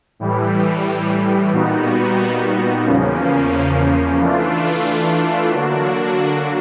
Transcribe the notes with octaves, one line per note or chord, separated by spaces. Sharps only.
A2 E3 G3
A#2 G3 B3 D#4 F#4
E2 C#3 F3 A#3 C#4
E3 A3 D4 F4
D3 F#3 A#3 D4 F#4